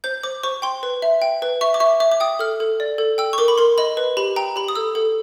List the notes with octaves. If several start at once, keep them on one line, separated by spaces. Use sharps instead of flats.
C5 G6
C5 D6
C5 C#6
G5 C6
B4
E5
G5
B4
E5 C#6
D6
E5 C#6
E5 D6
D6
G5 D#6
A4 F6
A4
D5
A4
G5 E6
C#6
A#4 D6
B5
A#4 C6
D#5 B5
B4
G4 B5
G5 A#5
G4 B5
D#6
A4 E6
A4